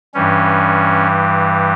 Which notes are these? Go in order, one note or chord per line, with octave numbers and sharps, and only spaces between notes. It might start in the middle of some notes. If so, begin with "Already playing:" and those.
G2 E3 G3 C#4